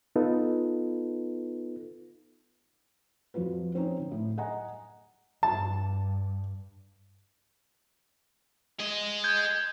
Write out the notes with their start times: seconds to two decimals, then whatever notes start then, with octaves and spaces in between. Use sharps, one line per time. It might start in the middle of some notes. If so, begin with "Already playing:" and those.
0.16 B3 D#4 F4 A4 B4
3.34 F2 F3 F4 F#4 B4
3.75 C4 C#4 D#4
4.00 D3
4.12 A2
4.38 D#5 F#5 G#5 A#5
5.43 G2 A5
8.80 G#4 D#5
9.24 G6 G#6